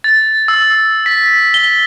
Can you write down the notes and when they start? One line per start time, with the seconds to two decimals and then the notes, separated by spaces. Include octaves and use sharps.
0.04 A6
0.48 E6
1.06 B6
1.54 G7